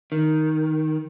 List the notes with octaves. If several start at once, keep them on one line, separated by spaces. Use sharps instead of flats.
D#3